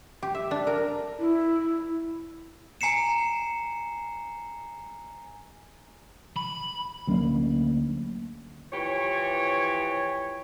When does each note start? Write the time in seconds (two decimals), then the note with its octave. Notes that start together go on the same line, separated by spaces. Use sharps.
0.23 G4
0.35 E5
0.51 D4
0.67 A#4
1.19 E4
2.81 G#5 A#5 C7 C#7 E7
6.36 B5
7.07 D2 F#3 A#3 C#4
8.72 E3 F3 G4 C#5